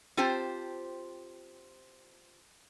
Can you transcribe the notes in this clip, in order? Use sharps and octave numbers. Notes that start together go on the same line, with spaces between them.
C4 F4 G4 C5 G5 A5